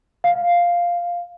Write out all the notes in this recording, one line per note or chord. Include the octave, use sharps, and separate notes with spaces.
F5